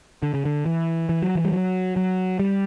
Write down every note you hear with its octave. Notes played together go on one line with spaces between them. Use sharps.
D3
C#3
D3
E3
E3
F#3
E3
G3
F#3
F#3
G3